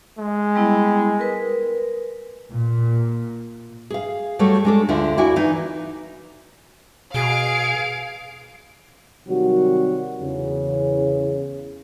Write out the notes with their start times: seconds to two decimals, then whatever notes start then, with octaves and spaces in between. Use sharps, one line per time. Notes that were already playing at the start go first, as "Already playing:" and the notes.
0.18 G#3
0.56 G3 B3 E4
1.19 A#4 B4
2.52 A#2
3.90 G#4 F5
4.39 F#3 G3 A3 G4 A4 C#5
4.65 G#3 D4 A4
4.88 D2 D3 D4 F4 E5
5.17 D#2 E4 F#4 D5 G#5
5.36 E3 D#4
7.14 B2 G#4 F5 D7
9.27 C3 D#3 F#3 G3 F#4
10.20 E2 C#3